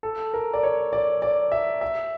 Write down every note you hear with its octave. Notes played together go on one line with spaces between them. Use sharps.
A4
A#4
D5
C#5
D5
D5
E5
E5